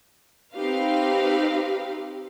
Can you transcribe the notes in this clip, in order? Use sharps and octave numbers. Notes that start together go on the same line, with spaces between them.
C4 D#4 G4 B4 F5